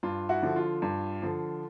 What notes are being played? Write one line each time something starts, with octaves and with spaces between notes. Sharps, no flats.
G2 F4
E4 F#4
D3 F3
F4
G2
D3 F3